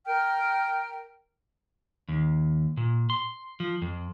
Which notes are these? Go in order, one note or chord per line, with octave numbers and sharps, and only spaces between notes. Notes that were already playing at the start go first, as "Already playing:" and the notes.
A#4 G5 F6
D#2
A#2
C6
F3
F2